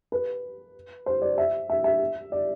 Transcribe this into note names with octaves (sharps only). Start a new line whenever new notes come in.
B4
C5
D5
E5
E5
E5
D5